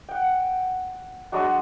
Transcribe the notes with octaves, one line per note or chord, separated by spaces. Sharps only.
F#5 G5
F#3 G#3 D4 F#4